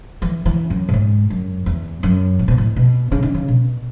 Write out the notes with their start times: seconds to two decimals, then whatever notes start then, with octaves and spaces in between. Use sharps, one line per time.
0.22 E3
0.46 E3
0.70 F#2
0.89 A2
0.93 G#2
1.30 F#2
1.66 E2
2.03 F#2
2.39 A2
2.48 B2
2.58 A2
2.76 B2
3.12 C#3
3.23 D#3
3.34 C#3
3.48 B2